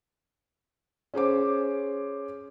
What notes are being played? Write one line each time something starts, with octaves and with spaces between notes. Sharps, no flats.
C#4 G#4 C5 D6